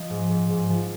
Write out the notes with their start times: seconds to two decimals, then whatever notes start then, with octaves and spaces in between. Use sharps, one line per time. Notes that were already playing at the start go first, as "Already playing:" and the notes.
Already playing: F3 D#5
0.10 G#2
0.31 G#2
0.49 G#2
0.70 F3